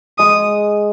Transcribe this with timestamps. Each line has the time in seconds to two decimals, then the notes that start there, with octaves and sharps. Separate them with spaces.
0.18 G#3 D#6